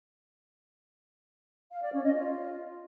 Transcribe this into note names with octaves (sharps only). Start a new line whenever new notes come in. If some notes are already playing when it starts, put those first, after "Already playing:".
F5
D5
C#4
D#5
F4